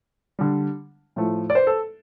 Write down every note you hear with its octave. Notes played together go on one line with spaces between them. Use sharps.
D3 G3
A2 F3 A3
D5
C5
A4